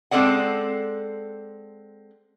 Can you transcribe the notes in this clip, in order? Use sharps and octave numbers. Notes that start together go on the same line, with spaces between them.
G#3 C4 C#4 A4 D5 F#5